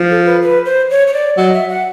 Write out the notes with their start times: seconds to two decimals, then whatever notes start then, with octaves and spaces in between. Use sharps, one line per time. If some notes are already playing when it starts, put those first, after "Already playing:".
Already playing: F3
0.10 A4
0.26 B4
0.42 B4
0.65 C5
0.90 C#5
1.07 C#5
1.13 D5
1.38 F#3 D#5
1.54 E5
1.70 F#5